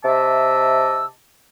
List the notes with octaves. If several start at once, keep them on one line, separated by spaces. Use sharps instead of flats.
C3 D#5 E5 A5 D6 E6